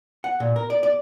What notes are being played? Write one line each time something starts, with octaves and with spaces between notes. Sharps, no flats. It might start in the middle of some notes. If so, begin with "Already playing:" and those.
F#5
A#2
A#4
D5
D5